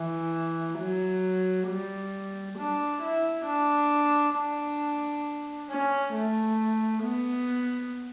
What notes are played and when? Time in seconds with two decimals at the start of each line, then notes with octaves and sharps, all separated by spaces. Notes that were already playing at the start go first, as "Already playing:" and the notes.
Already playing: E3
0.78 F#3
1.68 G3
2.58 D4
3.02 E4
3.46 D4
4.36 D4
5.70 C#4
6.14 A3
7.04 B3